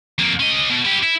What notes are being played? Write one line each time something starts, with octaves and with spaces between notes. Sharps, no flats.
F2 A#3
C#4 D#5
B2
E4 G4
E4